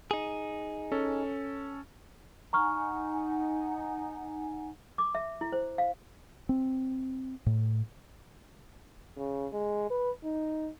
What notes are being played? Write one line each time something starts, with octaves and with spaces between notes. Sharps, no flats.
D#4 G#4
C#4 A4
D#4 F#5 G#5 A#5 C#6 F6
D6
E5
E4
C5
F5
C4
A2
C#3
G#3
B4
D#4